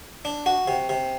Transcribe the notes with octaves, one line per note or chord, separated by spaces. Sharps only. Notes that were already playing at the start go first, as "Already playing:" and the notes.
D4
F#4
C3
C3